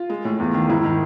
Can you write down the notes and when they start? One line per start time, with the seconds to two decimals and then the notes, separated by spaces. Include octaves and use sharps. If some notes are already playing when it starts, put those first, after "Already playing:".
Already playing: F4
0.10 G#3
0.25 A2
0.40 E2
0.54 D#3
0.69 G#2 E4
0.84 D#3